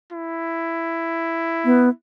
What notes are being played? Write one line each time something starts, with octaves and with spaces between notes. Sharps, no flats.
E4
B3